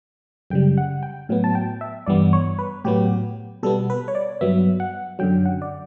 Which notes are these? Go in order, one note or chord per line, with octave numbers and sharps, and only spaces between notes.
F#2 C#3 G3 G5
F#5
G5
A2 F#3 B3
A5
G5
E5
G2 E3 G3 B3 D5
C#5
B4
A2 F#3 B3 G4
B2 G3 B3 A4
B4
C#5
D5
G2 F#3 B3 E5
F#5
F#2 D3 F#3 G5
F#5
D5